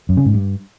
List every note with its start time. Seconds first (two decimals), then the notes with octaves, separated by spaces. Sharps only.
0.09 F#2
0.17 C#3
0.26 G#2
0.34 G2